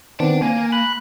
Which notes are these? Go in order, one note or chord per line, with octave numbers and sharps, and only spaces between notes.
D#3 B3 C4 D5 A5
A#3 G#5
B5 F#6